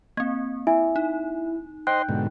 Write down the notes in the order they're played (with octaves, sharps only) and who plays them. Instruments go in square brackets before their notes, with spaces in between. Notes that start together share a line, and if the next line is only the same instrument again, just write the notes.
[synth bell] A#3 C4 [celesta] G#6
[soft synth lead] E4 [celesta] E5 G#5
[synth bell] D#4
[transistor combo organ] C5 D#5 C6 [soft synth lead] G5 [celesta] F#6
[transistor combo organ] G#2 B2 D3